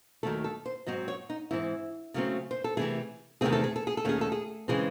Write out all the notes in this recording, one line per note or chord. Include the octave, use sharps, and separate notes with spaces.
D#2 D#3 F#3 A3 A4
A4
C5
G#2 F#3 C4 D#5
C#5
D#4
G#2 E3 C4 E4
C#3 F#3 A3 C4
C5
A4
C3 E3 A3 G#4
E2 C3 D#3 A3 C4 G#4
A4
G#4
A4
G#4
A4
D#2 D#3 A3 C#4 G#4
A4
G#4
C#3 E3 G#3 C4 G#4